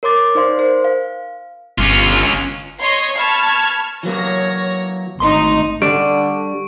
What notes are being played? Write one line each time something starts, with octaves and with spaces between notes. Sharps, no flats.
A#4 C#5 C6 D6 A6
D#4 C5 D5 F5 C6
A#4 C5
F5
G1 C#4 F4
C#5 D#5 C6 C#6 C7
A5 B5 C#6 F6 G#6
E3 F#3 A#3 C#5 A#6
G#1 D2 D#4 C6
D3 G3 D4 C#6 D7